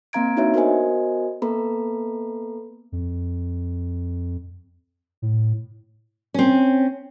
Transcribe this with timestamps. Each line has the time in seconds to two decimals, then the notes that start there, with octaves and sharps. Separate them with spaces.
0.13 A#3 C4 F5 A#5 G#6 D7
0.37 D4 D#4 F#4 B4 C#5 E5
0.54 B3 F#4 A#4 C5 D#5 G#5
1.42 A#3 B3 A4 B4 A#5 B5
2.92 F2
5.22 A2
6.34 C4 C#4